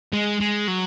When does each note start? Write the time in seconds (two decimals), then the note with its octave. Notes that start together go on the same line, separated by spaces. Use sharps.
0.13 G#3
0.40 G#3
0.68 F#3